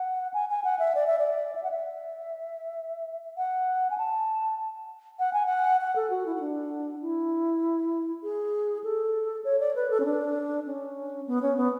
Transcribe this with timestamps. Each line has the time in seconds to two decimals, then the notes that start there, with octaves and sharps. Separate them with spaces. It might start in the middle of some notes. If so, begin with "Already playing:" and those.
Already playing: F#5
0.34 G#5
0.49 G#5
0.64 F#5
0.79 E5
0.95 D5
1.07 E5
1.19 D5
1.55 E5
1.63 F#5
1.71 E5
3.37 F#5
3.90 G#5
3.98 A5
5.19 F#5
5.33 G#5
5.46 F#5
5.81 F#5
5.96 A4
6.10 F#4
6.26 E4
6.36 E4
6.40 D4
7.02 E4
8.23 G#4
8.84 A4
9.44 C#5
9.60 D5
9.76 B4
9.90 A4
10.00 C#4
10.05 D4
10.66 C#4
11.27 B3
11.42 C#4
11.57 B3